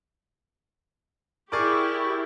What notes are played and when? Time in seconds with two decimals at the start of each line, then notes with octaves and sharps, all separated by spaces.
1.52 E4 G4 G#4 A#4 D5 C#6 D6